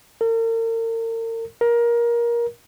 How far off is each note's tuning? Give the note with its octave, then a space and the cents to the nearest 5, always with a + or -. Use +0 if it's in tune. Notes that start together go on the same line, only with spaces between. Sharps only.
A#4 -40
A#4 +20